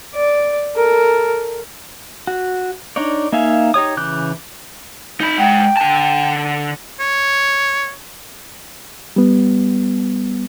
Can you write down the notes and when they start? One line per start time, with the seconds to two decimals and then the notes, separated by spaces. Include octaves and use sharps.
0.15 D5
0.76 A4 A#4
2.27 F#4
2.96 D4 D#4 C#5 D5
3.32 A#3 D#4 E5 F5 G#5
3.74 D#4 G4 C#5 D#6
3.97 C#3 E3 D6 F#6 G6
5.20 D#4 B5
5.38 G#3 F#5 G5
5.77 D3 A5
7.00 C#5
9.16 G3 B3